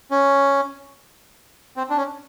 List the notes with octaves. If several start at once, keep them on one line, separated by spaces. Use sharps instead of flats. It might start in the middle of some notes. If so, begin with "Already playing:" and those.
C#4
C4
D4
C#4